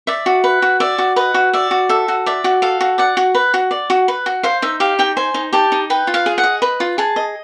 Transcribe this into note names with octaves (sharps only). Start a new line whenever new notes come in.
D5 E5
F#4
B4
F#4
D5 E5
F#4
B4 D#5
F#4
D5 E5
F#4
A4 E5
F#4
D5 E5
F#4
A4 F5
F#4
D5 F#5
F#4
B4
F#4
D5
F#4
B4
F#4
C5 F5
D#4 E5
G4 F5
D#4 G5
C5 G#5
D#4
G4 A5
D#4
B4 G5
F4
F5
G#4
F#5
D#5
B4
F4
G#4 A5
D#5